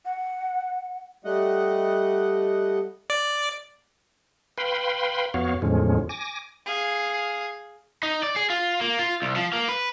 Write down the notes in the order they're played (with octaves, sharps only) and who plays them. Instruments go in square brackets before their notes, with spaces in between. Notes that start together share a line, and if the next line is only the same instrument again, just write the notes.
[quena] F#5
[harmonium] G3 A3 D#5 F#5
[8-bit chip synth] D5
[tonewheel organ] B4 F5 G5 B5 C6
F2 B3 F#4 C#5 F5
E2 A2 D3 F3 G#3 C#4
G#5 D6 A#6
[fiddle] G#4 F5
[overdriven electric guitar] D#4
D5
G#4
F4
A#3
F4
C2
F3
A#3
B4